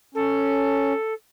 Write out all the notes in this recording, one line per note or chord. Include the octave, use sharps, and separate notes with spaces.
C#4 A4